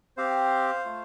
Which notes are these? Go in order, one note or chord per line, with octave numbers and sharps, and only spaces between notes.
C4 G4 C5 F5
A3 F4